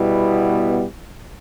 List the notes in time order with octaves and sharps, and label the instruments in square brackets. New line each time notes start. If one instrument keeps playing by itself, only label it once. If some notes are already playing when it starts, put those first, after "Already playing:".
Already playing: [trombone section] B2 G3 B3 E4